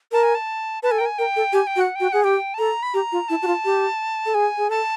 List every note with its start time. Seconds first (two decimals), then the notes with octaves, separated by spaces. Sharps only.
0.12 A#4 A5
0.23 G#5
0.35 A5
0.83 B4 A5
0.91 A4 G#5
0.98 A#4 G5
1.06 G#5
1.18 A#4 G5
1.36 A4
1.53 G4 G#5
1.67 G5
1.76 F#4
1.81 F#5
1.95 F#4 G5
2.12 G#4 F#5
2.24 G4 G5
2.54 A5
2.58 A4 A#5
2.83 B5
2.94 G4 A#5
3.12 F4
3.29 E4 A5
3.42 F#4
3.47 F4
3.65 G4
4.26 A4
4.34 G#4 G#5
4.58 G#4
4.70 A4 A5